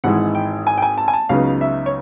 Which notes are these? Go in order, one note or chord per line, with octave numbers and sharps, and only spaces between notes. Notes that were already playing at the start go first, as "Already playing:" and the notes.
G#1 G#2 E3 G#3 F#5
G5
G#5
G5
G#5
A5
G#5
A5
C#2 C#3 F#3 B3 D#4 F5
E5
C#5